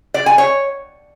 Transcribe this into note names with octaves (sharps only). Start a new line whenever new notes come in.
D5
G#5
C#5